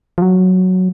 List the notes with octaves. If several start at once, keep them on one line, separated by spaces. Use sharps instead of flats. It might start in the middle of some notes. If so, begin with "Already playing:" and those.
F3
F#3